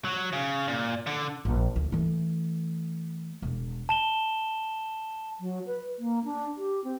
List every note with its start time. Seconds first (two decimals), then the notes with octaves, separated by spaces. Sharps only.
0.05 F#3
0.33 C#3
0.68 A#2
1.07 D3
1.45 A#1
1.76 D2
1.92 E3 A3
3.42 E1
3.89 A5 E7 G7
5.39 F#3
5.66 B4
5.99 A#3
6.24 D4
6.57 G4
6.84 C4